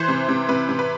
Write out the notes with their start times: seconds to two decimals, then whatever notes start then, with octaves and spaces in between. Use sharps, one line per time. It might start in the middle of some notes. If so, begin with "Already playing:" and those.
Already playing: E3 C5
0.08 C3
0.29 C3
0.49 C3 B4
0.69 C3
0.79 B4